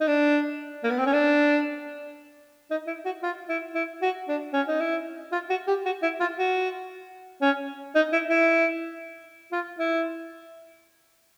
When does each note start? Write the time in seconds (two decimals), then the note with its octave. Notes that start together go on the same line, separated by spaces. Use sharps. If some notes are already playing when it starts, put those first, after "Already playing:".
0.01 D#4
0.08 D4
0.84 A#3
0.90 B3
0.98 C4
1.06 C#4
1.13 D4
2.71 D#4
2.87 E4
3.05 F#4
3.23 F4
3.49 E4
3.75 E4
4.02 F#4
4.28 D4
4.53 C#4
4.68 D#4
4.80 E4
5.32 F4
5.50 F#4
5.68 G4
5.85 F#4
6.03 E4
6.20 F4
6.37 F#4
7.42 C#4
7.95 D#4
8.13 E4
8.30 E4
9.52 F4
9.79 E4